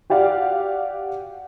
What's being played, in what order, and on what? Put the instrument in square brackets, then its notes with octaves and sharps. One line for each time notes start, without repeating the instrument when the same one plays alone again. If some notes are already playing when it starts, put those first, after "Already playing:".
[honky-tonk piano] F#4 G4 D5 F5 F#5